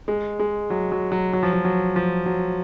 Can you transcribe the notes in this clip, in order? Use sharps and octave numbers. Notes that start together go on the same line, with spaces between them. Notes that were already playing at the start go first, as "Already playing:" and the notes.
G#3
G#3
F#3
F#3
F#3
F#3
F3
F#3
F#3
F3
F#3